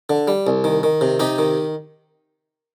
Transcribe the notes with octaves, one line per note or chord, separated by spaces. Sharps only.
D3
G3
C2
D#3
D#3
C3
C3 D#4 G4
D#3